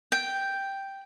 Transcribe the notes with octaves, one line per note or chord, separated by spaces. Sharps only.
G5